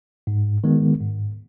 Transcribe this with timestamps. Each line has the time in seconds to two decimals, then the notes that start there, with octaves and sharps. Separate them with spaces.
0.27 G#2
0.64 D#3 G#3 B3
1.01 G#2